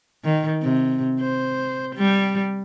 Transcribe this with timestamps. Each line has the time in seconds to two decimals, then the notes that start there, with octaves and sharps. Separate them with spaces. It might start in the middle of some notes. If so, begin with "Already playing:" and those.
0.24 D#3
0.62 C3
1.21 C5
1.96 G3